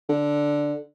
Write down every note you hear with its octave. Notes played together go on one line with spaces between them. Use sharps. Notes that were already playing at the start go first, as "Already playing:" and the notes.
D3